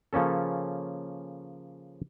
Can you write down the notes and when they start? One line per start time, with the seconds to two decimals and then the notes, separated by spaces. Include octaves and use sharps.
0.13 C#3 F3 A#3 C#4 A4